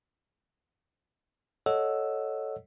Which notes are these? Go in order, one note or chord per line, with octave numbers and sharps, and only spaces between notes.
A4 C#5 D#5 F#5 E6